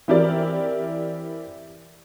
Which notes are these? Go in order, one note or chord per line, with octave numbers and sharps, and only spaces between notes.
E3 C4 E4 G4 A#4 D5